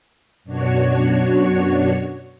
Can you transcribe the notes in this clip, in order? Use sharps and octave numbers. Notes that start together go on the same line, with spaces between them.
F#2 B2 D4 F#4 C#5